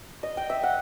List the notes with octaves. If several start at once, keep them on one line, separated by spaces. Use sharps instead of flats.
D#5
G5
E5
F#5